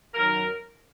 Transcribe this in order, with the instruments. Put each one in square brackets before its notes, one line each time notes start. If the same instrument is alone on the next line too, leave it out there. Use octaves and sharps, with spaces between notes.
[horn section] F#2 D#3 F#3 A#4